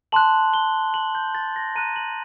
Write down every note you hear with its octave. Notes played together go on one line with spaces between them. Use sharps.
A5 C6 F#6 F#7
G7
F#7
G6
A6
A#6
A#5 F#6 D#7
F#7